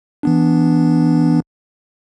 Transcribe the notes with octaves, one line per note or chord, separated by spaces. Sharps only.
E3 B3 D4